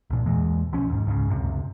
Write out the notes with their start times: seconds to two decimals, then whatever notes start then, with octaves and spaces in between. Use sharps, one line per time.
0.10 C2 A#2
0.26 E2 A#2 E3 G#3
0.73 B1 F3 C#4
0.89 D#2 G#2
1.06 C#2 G#2 C#3
1.29 C#2 F#2 C3